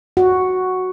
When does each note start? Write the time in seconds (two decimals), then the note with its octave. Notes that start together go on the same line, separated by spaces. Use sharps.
0.17 F#4